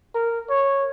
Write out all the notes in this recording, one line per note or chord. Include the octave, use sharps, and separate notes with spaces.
A#4
C#5